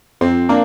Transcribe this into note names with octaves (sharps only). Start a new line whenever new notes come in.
F2 C4
A#3 D4